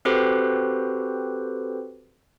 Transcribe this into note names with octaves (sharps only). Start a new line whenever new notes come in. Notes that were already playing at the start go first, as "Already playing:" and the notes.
C4 F#4 G4 A4 B4 C5